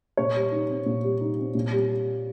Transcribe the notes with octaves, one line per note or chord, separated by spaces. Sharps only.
A#2 C#5
G3
D#4
C4
A#2
G3
D#4
C4
A#2
G3